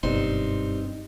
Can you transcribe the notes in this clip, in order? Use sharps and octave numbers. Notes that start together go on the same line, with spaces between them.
F#1 G2 B2 C4 D#4 C6